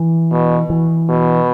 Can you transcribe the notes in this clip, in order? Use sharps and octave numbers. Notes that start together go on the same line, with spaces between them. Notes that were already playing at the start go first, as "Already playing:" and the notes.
Already playing: E3
B2
E3
B2